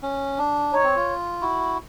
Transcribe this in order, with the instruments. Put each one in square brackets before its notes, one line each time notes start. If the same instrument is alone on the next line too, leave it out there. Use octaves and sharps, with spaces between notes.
[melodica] C#4
D4
[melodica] D#4 [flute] C#5
[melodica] C4
F4
E4 F#4